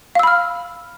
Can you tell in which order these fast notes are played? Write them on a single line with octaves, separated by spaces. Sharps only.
F5 E6 B5 F6